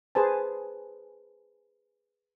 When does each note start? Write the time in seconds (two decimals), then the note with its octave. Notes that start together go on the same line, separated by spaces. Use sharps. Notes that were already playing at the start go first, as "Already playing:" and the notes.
0.15 G#4 B4 C5 G#5 A5